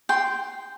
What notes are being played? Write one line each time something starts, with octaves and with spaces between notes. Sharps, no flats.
G5 C6